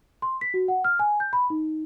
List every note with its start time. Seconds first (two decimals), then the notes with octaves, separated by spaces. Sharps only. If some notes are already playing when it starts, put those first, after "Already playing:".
0.22 C6
0.41 B6
0.54 F#4
0.68 F#5
0.84 F6
0.99 G#5
1.20 G6
1.33 B5
1.50 D#4